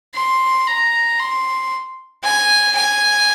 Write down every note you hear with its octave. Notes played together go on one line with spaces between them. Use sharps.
C6
A#5
C6
G#5
G#5